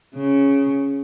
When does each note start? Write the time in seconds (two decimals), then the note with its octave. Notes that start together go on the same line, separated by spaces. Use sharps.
0.16 C#3